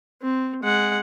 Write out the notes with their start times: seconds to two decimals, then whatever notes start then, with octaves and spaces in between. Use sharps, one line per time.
0.22 C4
0.63 G#3 F#5